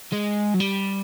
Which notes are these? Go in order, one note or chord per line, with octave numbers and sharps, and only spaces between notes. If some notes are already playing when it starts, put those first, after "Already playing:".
G#3
F#3
G3